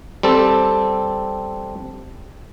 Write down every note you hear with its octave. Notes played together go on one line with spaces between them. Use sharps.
G3 C4 A4